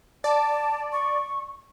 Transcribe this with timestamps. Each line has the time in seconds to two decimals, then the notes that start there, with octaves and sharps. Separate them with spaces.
0.24 D5 A5
0.92 C#6